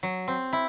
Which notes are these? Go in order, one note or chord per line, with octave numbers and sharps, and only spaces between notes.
F#3
C4
E4